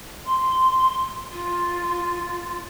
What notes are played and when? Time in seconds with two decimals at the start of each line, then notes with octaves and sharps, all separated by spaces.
0.25 C6
1.31 F4